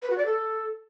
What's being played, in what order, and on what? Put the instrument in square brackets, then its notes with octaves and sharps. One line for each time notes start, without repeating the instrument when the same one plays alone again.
[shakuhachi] B4
F#4
D5
A4